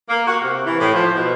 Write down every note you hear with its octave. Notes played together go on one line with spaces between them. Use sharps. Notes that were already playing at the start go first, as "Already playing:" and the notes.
A#3
F#4
C3
E3
A2
F3
B2